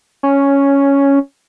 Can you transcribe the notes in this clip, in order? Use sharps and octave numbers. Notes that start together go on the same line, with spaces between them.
C#4